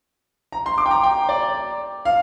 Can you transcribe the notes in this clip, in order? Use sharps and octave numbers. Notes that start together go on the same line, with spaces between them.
A#5
C6
D6
G5
A#5
G5
D5
F5